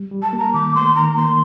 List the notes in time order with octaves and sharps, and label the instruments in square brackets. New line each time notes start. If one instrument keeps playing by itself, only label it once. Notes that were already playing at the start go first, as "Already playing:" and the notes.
Already playing: [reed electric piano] G3
G3
[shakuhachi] A5
[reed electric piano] A#3
[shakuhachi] A#5
[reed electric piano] D#3 [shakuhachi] D6
[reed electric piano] A3 [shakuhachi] C6
[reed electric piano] D#3 [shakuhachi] A#5
[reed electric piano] A#3 [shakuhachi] C6